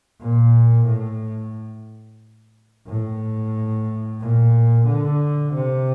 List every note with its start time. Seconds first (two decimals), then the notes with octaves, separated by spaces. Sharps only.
0.21 A#2
0.86 A2
2.87 A2
4.21 A#2
4.88 D3
5.54 C3